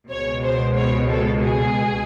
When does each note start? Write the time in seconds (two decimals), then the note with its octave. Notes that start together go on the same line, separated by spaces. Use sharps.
0.11 C#2 B2 G#3 C#5
0.44 C5
0.76 C#5
1.09 A4
1.42 G#4